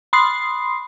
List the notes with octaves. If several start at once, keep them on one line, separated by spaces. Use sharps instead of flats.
B5 C6 D#6 C7